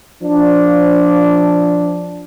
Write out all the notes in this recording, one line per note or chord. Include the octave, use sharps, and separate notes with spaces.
F3 D4